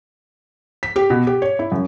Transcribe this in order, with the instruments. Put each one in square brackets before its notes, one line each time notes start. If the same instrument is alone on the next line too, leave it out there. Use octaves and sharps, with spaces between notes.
[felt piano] B6
G4
B2
G4
C#5
E4
F#2